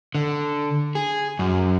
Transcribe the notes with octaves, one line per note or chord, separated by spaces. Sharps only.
D3
G#4
F#2